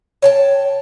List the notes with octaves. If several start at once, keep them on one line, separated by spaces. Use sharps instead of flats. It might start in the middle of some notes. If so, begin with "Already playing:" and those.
C#5 G5 A5